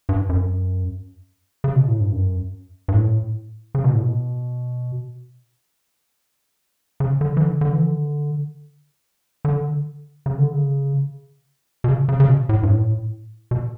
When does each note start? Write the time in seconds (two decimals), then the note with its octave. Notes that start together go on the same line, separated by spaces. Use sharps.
0.09 G2
0.29 F#2
1.64 C#3
1.76 B2
1.88 A2
2.00 G2
2.12 F#2
2.88 G2
2.94 A2
3.75 C#3
3.84 B2
3.93 A2
4.03 B2
7.00 C#3
7.21 D3
7.37 E3
7.41 D3
7.61 D3
7.72 E3
7.82 D3
9.45 D3
10.26 C#3
10.39 D3
10.52 C#3
11.84 B2
11.88 C#3
12.09 C#3
12.20 C#3
12.29 B2
12.49 A2
12.63 G2
12.69 A2
13.51 B2